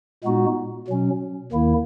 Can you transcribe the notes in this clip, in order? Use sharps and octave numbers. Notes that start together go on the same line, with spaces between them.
A#2 G#3 B3 D#4 F#4
B2 F#3 C#4
D#2 D#3 A#3 E4